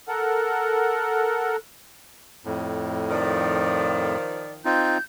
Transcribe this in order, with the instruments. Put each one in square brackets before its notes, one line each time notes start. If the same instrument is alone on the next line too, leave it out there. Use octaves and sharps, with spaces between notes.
[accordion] A4 A#4 F#5
[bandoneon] F2 A2
[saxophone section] D#3 F3 [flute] D5
[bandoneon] C4 D#4 F4 [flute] G6